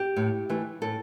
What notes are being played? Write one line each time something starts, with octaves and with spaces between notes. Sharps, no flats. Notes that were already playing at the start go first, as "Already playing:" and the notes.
Already playing: G4
A2
E3 A3
A2 A4